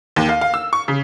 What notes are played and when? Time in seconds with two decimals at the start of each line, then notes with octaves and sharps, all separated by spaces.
0.16 D#2
0.29 F5
0.41 F5
0.54 E6
0.73 C#6
0.88 C#3